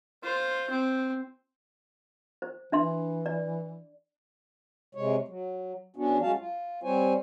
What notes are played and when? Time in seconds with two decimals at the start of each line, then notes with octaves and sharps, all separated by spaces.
0.23 F4 C5
0.70 C4
2.42 C5
2.72 E3 D4 E5 C6
3.26 D5
4.95 C3 G#3 C#5
5.28 F#3
5.96 E2 B3 C#4 D4 F#4
6.22 F#3 G#3 C#4 F#4 F5 A5
6.37 F4
6.83 G3 C4 C5 C#5 G#5